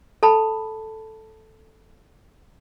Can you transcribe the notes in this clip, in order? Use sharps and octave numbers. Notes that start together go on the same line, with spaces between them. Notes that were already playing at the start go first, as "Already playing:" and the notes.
A4 A5 B5